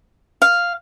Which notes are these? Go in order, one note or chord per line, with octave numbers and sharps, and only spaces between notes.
F5